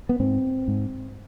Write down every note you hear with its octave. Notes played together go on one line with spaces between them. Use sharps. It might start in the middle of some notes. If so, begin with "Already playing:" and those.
B3
G#2 C4
G#2